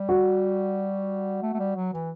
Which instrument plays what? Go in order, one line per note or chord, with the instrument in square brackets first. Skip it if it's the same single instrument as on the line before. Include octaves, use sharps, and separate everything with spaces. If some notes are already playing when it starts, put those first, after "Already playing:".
Already playing: [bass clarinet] G3
[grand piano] F#4
[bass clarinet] A3
A3
G3
F#3
E3